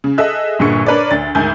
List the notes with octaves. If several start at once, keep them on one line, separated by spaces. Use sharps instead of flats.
C#3
G#4 A4 D#5 E5 F#6
G1 A#2 D3 G#4 C#6 C#7
D4 A#4 B4 C#5 D5
D2 A6
G#1 D2 A#4 G#5 G6